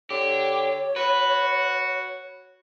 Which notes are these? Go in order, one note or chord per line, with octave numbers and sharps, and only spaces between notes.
D3 G4 C#5
F#4 B4